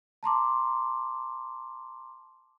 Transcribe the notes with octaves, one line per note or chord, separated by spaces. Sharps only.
A5 A#5 C6 D6